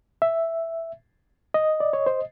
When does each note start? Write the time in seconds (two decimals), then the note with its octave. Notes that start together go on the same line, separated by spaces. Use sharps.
0.22 E5
1.54 D#5
1.80 D5
1.93 C#5
2.06 C5